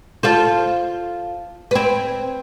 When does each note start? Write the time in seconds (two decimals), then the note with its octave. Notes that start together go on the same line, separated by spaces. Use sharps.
0.23 F4 A4 C5
1.71 C4 B4